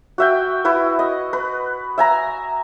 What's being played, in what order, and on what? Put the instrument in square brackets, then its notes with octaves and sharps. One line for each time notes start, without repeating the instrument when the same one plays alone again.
[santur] F#4 E5 G5
E4 F#4 B4
D#5
B4
E5 G#5 A#5